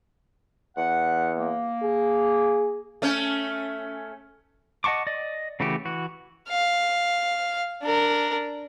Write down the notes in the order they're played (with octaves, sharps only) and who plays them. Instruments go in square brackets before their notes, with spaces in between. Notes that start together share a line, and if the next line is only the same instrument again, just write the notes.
[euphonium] E2 [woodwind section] F#5
[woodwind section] A#3
[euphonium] G#4
[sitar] A3 C#4
[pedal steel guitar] D#5 F#5 A5 C#6 D6
D5 D#5
C#3 E3 A3 F#4 G4
E3 F#4
[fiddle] F5
D4 A#4